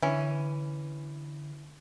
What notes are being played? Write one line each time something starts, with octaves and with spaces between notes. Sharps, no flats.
D3 E3 C#4